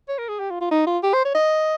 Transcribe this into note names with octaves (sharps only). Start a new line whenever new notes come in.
C#5
A#4
G#4
G4
F4
F4
D#4
F4
G4
C5
C#5
D#5